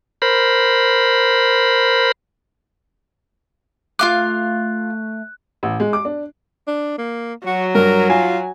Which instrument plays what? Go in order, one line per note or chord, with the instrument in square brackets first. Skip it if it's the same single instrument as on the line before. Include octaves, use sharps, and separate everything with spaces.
[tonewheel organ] A#4 C5 B5
[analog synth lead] A3 [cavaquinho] F4 F5 D6 [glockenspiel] F#6
[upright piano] A1
G#3
D6
D4
[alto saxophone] D4
A#3
[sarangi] F#3 [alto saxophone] F#4
[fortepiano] G2 [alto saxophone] A#4
[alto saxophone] F4 [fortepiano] G#5